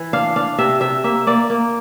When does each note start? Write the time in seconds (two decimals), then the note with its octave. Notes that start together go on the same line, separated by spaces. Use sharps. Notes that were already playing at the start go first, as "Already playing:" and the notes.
Already playing: E3
0.13 D4 F5
0.36 D4 F5
0.58 C3 E5
0.81 C3 E5
1.04 A#3 E5
1.27 A#3 D5
1.50 A#3